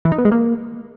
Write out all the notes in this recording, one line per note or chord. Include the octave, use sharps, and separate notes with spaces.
E3
D#4
B3
G#3
A#3